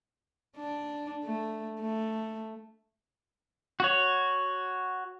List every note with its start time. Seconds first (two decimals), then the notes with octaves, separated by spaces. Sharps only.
0.57 D4
1.24 A3
1.81 A3
3.80 F#4 C#5